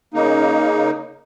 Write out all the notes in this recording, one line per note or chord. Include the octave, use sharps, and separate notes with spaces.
C#3 A#3 D#4